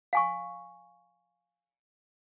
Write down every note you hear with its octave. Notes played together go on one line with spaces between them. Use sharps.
F5 G#5 C#6